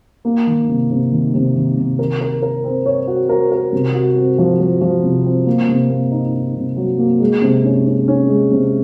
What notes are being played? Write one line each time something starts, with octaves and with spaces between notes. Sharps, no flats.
A#3
D#3
C3
C3
D#3
C3
D#3
C3
A#4
A#4
A#4
C4
C#5
F#4
A#4
A#4
C3
F#4
C4
F3
F3
F3
C3
C4
A#3
C3
A#3
D#4
D#4
C3
F#3
A#3
G#3
C3
C#4
C#4
C#4
G#3
C3